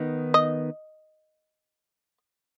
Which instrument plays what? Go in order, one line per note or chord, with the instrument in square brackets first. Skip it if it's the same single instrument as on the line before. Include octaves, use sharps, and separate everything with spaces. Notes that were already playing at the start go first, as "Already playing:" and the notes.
Already playing: [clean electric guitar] D#3 B3 D#4
[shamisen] D#5